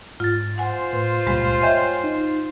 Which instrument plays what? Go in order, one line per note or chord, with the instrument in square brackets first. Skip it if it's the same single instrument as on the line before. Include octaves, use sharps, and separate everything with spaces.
[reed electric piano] G#2 A6 [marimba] F4
[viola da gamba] F4 C5 [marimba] F#5 G#5
[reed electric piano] A2 [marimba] B4
[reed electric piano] C#2 A#2 [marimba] G2 G3 G#3
[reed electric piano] C#5 G5 G#5 [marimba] D#5 E5 G6
[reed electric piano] D#4